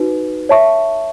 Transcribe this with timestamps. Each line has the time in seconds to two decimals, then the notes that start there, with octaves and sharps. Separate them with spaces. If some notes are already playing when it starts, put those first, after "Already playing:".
Already playing: D#4 F#4 B4
0.49 C#5 E5 A5 C#6